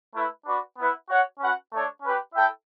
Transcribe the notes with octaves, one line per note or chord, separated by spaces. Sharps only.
A3 E4 B4
D4 F#4 B4 D5
B3 E4 B4 F#5
F#4 C#5 F#5
C#4 F#4 B4 F#5
A3 D4 A4 C#5
C#4 G4 B4
E4 A4 E5 G5